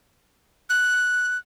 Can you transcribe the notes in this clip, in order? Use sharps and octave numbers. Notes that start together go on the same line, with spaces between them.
F#6